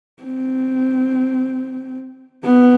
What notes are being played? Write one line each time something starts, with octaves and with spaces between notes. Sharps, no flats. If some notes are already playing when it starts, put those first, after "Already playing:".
C4
B3